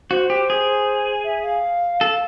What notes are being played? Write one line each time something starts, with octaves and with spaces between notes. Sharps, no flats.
F#4 C5
G4
G#4
E5
F5
A4